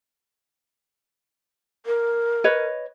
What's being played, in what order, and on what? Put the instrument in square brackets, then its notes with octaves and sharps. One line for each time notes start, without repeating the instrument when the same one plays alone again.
[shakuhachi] A#4
[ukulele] B4 C#5 D#5